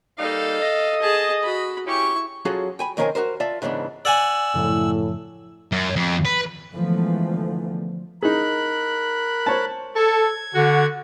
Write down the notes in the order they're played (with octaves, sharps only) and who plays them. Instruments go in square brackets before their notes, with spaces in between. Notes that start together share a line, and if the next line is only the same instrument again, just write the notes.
[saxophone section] G3 A#3 D#4 [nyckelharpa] A4 F5
[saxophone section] D#5
[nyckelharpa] G#4 A5
F#4 B5
[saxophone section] C#4 G4 [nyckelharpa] E4 C#6
[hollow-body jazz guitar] F#3 C#4 F4 F#4 G#4 A4
G5 G#5 B5
F2 D#3 C#4 A#4 C5 G#5
F#4 G4 A#4 C5
F4 D5 E5 A5
G#2 C#3 E3 B3 D4
[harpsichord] D5 F#5 G#5 [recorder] E6
[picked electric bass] F#2 C#3 F3 [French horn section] A2
[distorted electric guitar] F#2
F2
B4
[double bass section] D3 E3 F3 G#3 A3 B3
[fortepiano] D#4 G#4 [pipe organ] A#4 B5 F#6
[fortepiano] C5 C#5 A5
[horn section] A4 [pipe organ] G#6
[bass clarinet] D3 [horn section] F#4